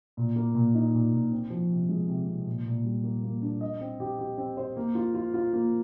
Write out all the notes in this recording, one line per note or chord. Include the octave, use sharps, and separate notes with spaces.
A#2
A#3
A#2
D#4
A#2
A#2
C4
F3
C3
G#3
C3
C3
A#2
A#2
G3
A#3
A#3
D4
D#5
C4
G4
G4
C4
C5
A#3
F4
F4
F4
A#3